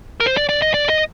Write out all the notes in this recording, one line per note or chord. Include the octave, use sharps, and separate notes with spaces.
A#4
C5
D5
D5
D#5
D5
D#5